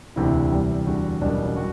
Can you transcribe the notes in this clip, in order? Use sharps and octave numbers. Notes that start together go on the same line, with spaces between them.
E1 D2 C3 E3 E4
E2 C3 G3
E2 D3 G3 F#4
F#1 E2 B2 G3 D4
D4
G3 F#4